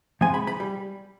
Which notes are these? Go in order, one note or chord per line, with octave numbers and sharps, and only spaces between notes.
F3 G#3 C4 G#5
B5
B5
G3